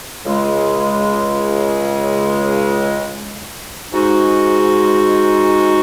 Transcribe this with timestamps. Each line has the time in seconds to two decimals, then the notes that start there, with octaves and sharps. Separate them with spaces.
0.25 C#2 C#3 G#3
3.92 G#2 G#3 D#4 F#4